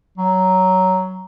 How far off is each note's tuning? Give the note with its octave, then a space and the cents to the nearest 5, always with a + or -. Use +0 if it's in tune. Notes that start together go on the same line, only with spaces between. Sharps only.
F#3 +10